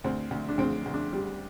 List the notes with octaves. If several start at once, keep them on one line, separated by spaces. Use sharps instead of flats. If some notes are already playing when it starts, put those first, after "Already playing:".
D2 C4
D2
D4
D2 C4
D2
D4
G3